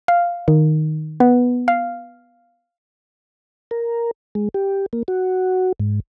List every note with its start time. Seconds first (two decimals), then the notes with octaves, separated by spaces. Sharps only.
0.08 F5
0.48 D#3
1.20 B3
1.68 F5
3.71 A#4
4.35 G#3
4.54 G4
4.93 A#3
5.08 F#4
5.80 G#2